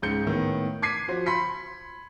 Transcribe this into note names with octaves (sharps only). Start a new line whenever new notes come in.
C#2 G#2 G6 C#7
A2 D#3 B3
D6 G#6 B6 C7 D#7
F3 F#4 C5
B5 C6 B6 C#7